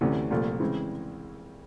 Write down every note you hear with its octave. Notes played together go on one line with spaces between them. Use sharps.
D2 C3 E3 A3 C#4
C2 A#2 F3 A3
C#3 E3 G#3 C4